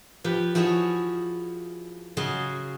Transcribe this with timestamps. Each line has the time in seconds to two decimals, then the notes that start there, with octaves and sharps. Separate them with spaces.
0.24 F3 G4 B4
0.55 F3 E4 F#4 G#4 C#5 D#5
2.17 C#3 F#3 D#5 G#5 C6